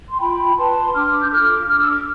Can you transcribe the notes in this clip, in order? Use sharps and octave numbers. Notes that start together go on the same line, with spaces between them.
C6
F4 G5 B5
B4 A5 C6
D4 D6 F6
G6
F4 A4 D6 F6
D4 F6
E6
D6 F6